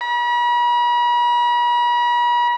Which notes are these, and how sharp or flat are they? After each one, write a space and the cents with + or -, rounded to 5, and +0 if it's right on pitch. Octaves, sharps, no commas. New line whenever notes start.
B5 -45